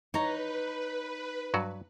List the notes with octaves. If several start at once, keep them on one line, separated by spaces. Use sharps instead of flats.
D#4 B4 C#5 A#5
G2 F#3 F#4